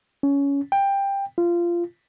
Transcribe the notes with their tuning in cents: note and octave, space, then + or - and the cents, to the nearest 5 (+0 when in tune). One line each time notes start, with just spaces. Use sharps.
C#4 +20
G5 +15
F4 -20